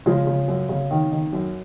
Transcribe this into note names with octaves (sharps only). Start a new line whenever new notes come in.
C#3 F3 G#3
C#3
F#2
C#3
D#3
D#3
F#2